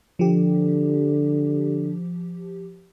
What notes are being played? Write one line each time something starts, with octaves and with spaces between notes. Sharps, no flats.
D3 F3 G4